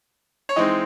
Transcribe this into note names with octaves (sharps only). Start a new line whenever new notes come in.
C#5
E3 G#3 C4 D#4 D#5